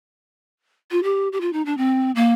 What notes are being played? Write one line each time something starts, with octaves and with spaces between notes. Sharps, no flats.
F4
G4
G4
F4
D#4
D4
C4
A#3